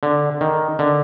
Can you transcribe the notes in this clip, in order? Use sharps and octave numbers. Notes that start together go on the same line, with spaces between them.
D3
D#3
D3